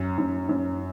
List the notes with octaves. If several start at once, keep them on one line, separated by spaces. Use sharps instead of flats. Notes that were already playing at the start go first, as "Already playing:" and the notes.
Already playing: F#2
F#2
F#2